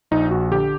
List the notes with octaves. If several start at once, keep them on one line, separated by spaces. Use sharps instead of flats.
A#1 D#4
A#1 F#4
D3 G4